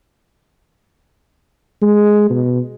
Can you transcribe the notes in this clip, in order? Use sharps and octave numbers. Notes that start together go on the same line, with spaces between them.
G#3
B2